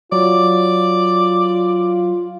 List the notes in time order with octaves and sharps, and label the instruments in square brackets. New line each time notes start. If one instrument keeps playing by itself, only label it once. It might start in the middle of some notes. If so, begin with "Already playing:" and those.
[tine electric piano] F#3 [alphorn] F4 [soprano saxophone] D5